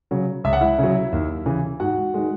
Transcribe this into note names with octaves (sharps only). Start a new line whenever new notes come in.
C#3 F#3
C#2 E5
F#5
E4 E5
C#3 F#3
D#2
C#3 E3
G#2 F#4 F#5
D#3 G#3